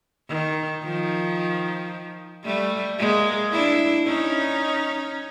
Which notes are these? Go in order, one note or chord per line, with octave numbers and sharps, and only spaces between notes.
D#3
D#3 F3
G3 A3
G#3 A#3
D4 E4
C#4 D#4